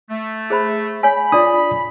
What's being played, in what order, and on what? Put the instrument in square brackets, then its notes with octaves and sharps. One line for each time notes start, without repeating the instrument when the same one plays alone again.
[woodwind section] A3
[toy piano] G#4 C5 B5
[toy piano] C#5 G#5 [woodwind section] B5
[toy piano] D4 [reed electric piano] F4 D5 D#6